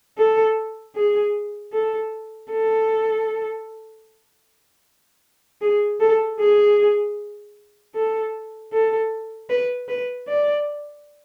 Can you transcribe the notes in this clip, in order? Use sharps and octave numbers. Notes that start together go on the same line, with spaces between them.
A4
G#4
A4
A4
G#4
A4
G#4
A4
A4
B4
B4
D5